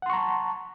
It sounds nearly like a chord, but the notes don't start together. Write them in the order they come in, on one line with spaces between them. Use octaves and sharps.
F#5 C6 C#6 A#5 A5